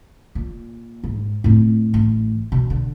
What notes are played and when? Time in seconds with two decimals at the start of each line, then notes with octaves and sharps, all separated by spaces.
0.35 A#2
1.04 G#2
1.44 A2 C4
1.94 A1
2.52 B2
2.70 D3